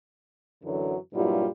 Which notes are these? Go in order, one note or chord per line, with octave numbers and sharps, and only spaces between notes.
F#2 D3 E3 F#3
G2 A#2 F#3 G3 E4 F4